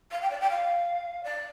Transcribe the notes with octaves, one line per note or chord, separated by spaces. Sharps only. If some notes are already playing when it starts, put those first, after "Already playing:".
F5
G5
D5
G5
F5
D5